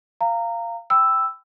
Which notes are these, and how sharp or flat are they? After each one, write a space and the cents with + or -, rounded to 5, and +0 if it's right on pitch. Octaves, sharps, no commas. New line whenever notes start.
F5 -15 A#5 -20
G5 +0 B5 +35 E6 +0